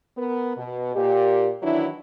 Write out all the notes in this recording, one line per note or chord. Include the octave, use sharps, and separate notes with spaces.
B3 A#4
B2
A#2 G4
D#3 E3 F#3 D4 E4